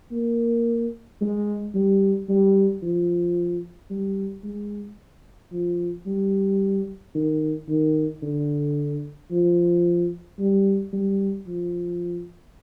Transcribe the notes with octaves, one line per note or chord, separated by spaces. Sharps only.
A#3
G#3
G3
G3
F3
G3
G#3
F3
G3
D#3
D#3
D3
F3
G3
G3
F3